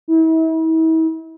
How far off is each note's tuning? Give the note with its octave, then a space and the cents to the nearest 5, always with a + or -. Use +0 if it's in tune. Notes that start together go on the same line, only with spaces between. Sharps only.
E4 -40